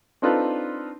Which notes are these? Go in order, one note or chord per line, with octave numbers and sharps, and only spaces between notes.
C4 D4 D#4 F4 A4 B4